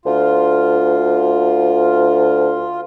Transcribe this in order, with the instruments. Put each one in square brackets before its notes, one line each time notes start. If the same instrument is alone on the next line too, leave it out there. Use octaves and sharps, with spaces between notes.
[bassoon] D2 [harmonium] F4